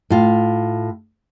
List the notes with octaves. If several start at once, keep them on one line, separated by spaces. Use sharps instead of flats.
A2 F4